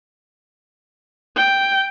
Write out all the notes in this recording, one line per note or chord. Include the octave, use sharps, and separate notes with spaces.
G5